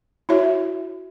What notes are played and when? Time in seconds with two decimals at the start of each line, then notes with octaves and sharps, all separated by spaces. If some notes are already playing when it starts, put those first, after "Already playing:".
0.29 E4 F#4 C#5 E5